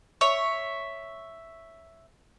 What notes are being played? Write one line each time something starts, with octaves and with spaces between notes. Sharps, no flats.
C#5 E5